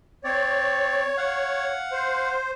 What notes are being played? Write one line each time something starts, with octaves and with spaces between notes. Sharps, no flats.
C4 C#5 D5
F5 F#5
C5